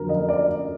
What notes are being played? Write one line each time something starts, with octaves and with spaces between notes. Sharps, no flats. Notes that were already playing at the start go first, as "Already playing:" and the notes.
Already playing: F2 D3 F#3 A#4
D#5
D5